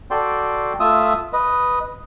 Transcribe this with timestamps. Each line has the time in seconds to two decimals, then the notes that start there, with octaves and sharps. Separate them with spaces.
0.11 F#4 A4 D5 G5 C6
0.80 A3 F4 E5 D#6 E6
1.33 B4 D#5